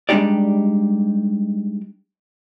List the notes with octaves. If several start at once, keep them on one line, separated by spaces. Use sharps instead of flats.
G3 G#3 D4 D#4 G4 D5